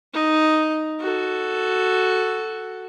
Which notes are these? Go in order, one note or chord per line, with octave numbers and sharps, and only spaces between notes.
D#4
F#4 A4